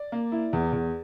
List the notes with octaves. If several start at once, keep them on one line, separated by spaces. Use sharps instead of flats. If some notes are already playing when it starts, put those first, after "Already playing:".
Already playing: D5
A#3
E4
E2
E2